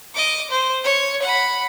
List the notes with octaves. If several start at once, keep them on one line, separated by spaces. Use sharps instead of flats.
D#5 D6
C5
C#5
F#5 B5